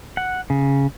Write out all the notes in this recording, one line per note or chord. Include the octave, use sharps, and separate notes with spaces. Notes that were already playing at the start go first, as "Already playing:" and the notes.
F#5
C#3